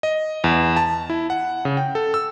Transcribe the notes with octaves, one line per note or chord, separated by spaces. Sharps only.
D#5
E2
A5
E4
F#5
C#3
G5
A4
E6